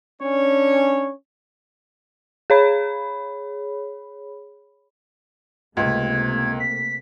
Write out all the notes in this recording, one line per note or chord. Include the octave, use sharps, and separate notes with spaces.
C#4 D4 C#5
G#4 C#5 B5
C#2 C3 A3 A#3 G#6
B6